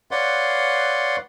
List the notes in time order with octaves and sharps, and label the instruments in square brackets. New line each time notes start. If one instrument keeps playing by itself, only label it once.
[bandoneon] B4 C#5 D5 F5 F#5 C6